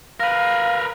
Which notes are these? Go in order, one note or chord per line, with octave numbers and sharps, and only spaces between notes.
A#4 B4 F5